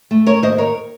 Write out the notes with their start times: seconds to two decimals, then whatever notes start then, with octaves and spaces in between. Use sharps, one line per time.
0.11 A3
0.26 A#4 C#5
0.43 D#2 C5 D#5
0.58 A#4 C#5